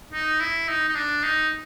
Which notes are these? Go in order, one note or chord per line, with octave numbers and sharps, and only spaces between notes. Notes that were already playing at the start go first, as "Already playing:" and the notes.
D#4
E4
D#4
D#4
D4
D#4